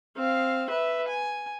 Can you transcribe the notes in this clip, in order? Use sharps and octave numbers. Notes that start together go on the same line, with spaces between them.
C4 F5
B4 E5
G#5